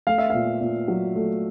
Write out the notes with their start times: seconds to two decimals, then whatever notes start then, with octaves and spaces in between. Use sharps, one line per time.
0.07 A3 F5
0.18 E5
0.30 A#2 F5
0.61 A#2
0.88 F#3
1.16 A3